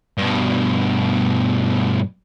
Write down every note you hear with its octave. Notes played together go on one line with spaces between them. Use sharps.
G2 B2